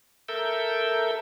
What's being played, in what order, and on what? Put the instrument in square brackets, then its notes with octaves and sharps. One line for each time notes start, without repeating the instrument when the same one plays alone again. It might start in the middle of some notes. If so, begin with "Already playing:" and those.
[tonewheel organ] A4 A#4 E5 G6